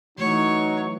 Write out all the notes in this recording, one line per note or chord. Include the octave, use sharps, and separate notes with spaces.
E3 F#3 A3 D#4 C#5